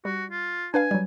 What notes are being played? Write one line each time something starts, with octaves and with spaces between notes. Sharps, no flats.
G3 F#4
F4
D4 B4 F5 G#5
F#3 G3